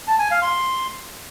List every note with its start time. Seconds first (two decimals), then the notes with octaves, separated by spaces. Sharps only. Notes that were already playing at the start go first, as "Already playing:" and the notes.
0.07 A5
0.19 G#5
0.31 F5
0.42 C6